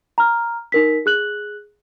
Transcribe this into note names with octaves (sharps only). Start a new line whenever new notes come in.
A#5 F6
D#4 A#4 B6
G#4 F#6 F#7